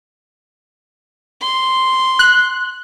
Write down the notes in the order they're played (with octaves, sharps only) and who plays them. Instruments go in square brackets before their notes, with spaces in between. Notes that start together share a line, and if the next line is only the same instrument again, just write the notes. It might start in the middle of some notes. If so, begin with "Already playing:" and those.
[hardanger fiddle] C6
[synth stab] F#6